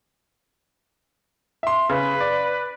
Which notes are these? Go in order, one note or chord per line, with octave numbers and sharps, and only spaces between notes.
E5 C6
C#3 B4
D5